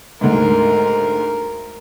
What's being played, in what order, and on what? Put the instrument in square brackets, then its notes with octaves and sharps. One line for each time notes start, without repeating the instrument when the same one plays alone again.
[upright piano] D2 G#2 [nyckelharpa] A#4